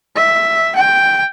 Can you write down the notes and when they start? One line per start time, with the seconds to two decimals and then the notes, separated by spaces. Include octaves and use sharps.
0.16 E5
0.75 G5